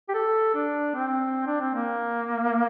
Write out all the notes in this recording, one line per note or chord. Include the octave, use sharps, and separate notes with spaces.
G4
A4
D4
C4
D4
C4
A#3